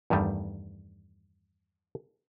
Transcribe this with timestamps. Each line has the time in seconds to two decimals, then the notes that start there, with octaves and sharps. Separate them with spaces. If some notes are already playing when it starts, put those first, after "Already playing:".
0.10 E2 G2 D#3 G3 A3